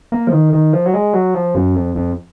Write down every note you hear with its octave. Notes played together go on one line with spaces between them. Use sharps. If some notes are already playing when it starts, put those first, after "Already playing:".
A#3
F3
D#3
D#3
F3
F#3
G#3
F#3
F3
F#2
F2
F2